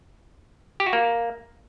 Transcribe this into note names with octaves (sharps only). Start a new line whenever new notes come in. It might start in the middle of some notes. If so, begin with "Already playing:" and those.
G4
F#4
A#3